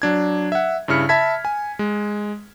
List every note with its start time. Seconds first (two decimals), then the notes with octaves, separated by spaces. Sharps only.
0.02 F#3 D4 G#6
0.52 E5 F#5
0.88 G2 C#3 E4 F6 C#7
1.09 E5 A5 B5 G#6 B6
1.45 G#5
1.79 G#3